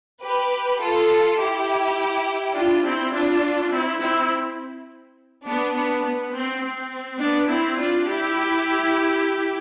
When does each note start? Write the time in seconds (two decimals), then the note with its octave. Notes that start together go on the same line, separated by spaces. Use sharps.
0.22 G4 B4
0.80 F4 A4
1.39 E4 G4
2.55 D4 F4
2.84 C4 E4
3.13 D4 F4
3.71 C4 E4
4.00 C4 E4
5.45 B3 D4
5.74 B3 D4
6.04 B3
6.33 C4
6.62 C4
7.20 B3 D4
7.49 C4 E4
7.78 D4 F4
8.07 E4 G4